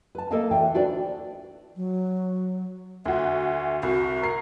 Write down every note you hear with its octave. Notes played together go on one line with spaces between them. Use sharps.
B4 A5
A#3 A4 A#4 D#5 F5 A5
D2 E3 G5
D4 D#4 F#4 B4 C5 D5
F#3
D2 F#4 E5
C2 F#4
A#4 C7